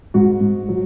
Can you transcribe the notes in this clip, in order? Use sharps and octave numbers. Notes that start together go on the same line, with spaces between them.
G#2 F#4
G#2
F#3